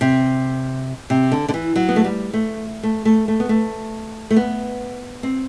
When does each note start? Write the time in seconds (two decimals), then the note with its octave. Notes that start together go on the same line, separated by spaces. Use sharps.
0.01 C3
1.10 C3
1.32 D3
1.48 D3
1.54 E3
1.76 F#3
1.89 B3
1.96 A3
2.05 G3
2.33 A3
2.83 A3
3.05 A3
3.28 A3
3.40 B3
3.49 A3
4.30 A3
4.36 B3
5.23 C4